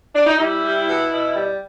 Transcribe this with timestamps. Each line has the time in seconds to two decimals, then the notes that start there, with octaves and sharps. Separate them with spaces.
0.14 D4
0.27 D#4
0.38 G3 E4
0.63 G3
0.87 B2
1.12 B2
1.36 G3